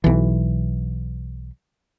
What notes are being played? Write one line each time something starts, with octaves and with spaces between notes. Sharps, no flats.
B1 E3